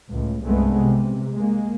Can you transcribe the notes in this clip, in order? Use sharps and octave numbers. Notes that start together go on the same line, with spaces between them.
C#2 A2
C2 G2 G#3 A3 B3
C3
G#3 A#3